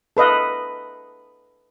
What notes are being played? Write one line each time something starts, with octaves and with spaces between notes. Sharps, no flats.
A4 B4 D#5 F5